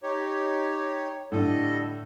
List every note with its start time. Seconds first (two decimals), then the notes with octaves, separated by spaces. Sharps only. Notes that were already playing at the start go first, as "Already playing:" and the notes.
0.03 D#4 G4 C#5
1.32 A2 D3 G3 A4 D#5